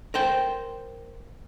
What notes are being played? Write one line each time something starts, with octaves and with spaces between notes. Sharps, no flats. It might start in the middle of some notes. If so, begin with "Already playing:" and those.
A#4 C5 G5